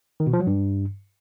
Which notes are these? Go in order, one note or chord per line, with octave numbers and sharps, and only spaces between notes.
D#3
B2
F3
F#3
G2